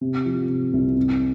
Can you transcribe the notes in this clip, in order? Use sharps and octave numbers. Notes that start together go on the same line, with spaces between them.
C3
F3
C3
C2
C3